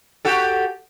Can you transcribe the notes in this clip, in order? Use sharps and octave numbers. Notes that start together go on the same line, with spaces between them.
F#4 G4 A4